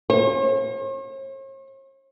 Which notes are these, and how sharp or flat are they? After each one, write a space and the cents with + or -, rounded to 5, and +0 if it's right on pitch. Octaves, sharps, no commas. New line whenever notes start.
C#5 -45